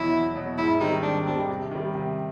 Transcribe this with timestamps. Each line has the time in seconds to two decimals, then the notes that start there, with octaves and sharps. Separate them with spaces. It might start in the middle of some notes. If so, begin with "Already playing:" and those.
Already playing: E2 B2 F#3 E4
0.11 E2
0.35 B2 F#3
0.58 G#2 E4
0.80 D#3 G3 C4 D#4
1.03 G#2 D4
1.26 D#3 G3 C4 D4
1.49 C3
1.71 D#3 G3
1.95 C3